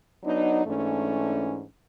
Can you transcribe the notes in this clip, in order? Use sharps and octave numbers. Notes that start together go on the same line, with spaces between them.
F#3 B3 D4 D#4
G#2 E3 A3 C#4 D4